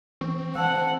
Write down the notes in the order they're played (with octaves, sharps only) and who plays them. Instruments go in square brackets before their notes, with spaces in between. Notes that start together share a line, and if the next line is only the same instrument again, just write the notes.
[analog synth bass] E3 [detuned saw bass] C4 [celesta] C#6
[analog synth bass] E3 [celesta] C5 A5 E6 [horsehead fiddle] F#5